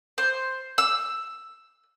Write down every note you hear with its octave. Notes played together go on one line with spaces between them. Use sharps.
C5
E6